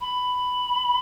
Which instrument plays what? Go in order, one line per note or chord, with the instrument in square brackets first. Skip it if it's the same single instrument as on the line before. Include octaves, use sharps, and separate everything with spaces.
[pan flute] B5